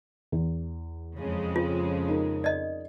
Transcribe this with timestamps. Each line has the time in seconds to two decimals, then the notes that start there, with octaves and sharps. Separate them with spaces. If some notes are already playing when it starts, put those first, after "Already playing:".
0.32 E2
1.16 F2 C#3 G#3
1.56 F4
2.08 D#4 A#4
2.44 D5 D#5